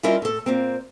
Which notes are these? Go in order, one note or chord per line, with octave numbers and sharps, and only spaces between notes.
G3 C#4 E4 F4 A#4 D#5
A2 A4
A#2 A#3 C4